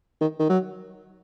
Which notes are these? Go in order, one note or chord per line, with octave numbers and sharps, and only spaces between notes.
D#3
D#3
F#3